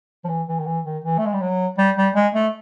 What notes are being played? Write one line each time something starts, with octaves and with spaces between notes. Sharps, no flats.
F3
E3
E3
D#3
E3
D#3
E3
A3
G#3
G3
F#3
G3
G3
G#3
A3